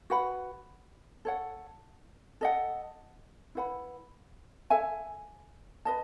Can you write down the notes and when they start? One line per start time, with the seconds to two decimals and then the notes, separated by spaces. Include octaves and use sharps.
0.10 F#4 B4 F#5 B5
1.25 A4 C#5 F#5
2.41 A4 D#5 F#5
3.55 E4 B4 F#5 B5
4.70 A4 E5 G#5
5.85 B4 D#5 A5